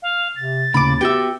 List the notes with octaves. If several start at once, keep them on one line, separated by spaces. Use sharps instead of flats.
F5
C3 A6
D#2 A2 C#3 B5 D6
B3 F#4 G4 E5 G5 E6